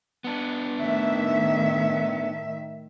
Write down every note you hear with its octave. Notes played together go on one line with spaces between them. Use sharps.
B3 D4
A2 D#3 E5